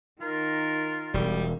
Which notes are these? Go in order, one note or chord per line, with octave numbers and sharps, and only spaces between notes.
D#3 F4 A#4
E1 G3